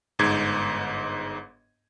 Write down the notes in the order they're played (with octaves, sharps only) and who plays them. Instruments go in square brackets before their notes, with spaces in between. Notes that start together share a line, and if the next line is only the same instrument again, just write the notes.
[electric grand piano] G1 G#2 G#6